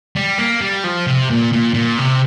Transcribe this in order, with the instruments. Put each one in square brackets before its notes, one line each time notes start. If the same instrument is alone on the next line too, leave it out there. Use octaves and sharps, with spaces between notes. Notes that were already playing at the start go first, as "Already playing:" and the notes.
[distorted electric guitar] G3
A#3
G3
F3
C3
A#2
A#2
A#2
C3